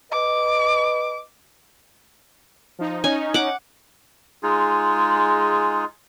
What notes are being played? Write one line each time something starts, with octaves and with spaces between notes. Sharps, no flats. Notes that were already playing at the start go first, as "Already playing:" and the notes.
B4 D#5 D6
F3 D#4
C#4 D#4 G#5
F#5 D6
G#3 D#4 F4 G#4